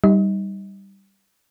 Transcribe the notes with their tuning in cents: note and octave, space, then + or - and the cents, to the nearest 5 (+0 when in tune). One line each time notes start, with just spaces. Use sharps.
G3 +0 D#4 +0 D#5 +35